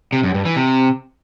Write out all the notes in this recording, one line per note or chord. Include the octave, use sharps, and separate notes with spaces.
C3
F#2
G2
E3
C3